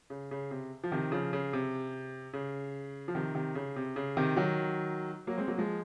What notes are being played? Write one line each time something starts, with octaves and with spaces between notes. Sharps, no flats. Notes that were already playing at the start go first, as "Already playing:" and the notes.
C#3
C#3
C3
F3
C3 D#3
C#3 F3
C#3
C3
C#3
F3
C3 D#3
C3 D#3
C#3
C3
C#3
C3 D#3
D#3 F#3
F#3 A#3
G#3 C4
F#3 A#3
F3 G#3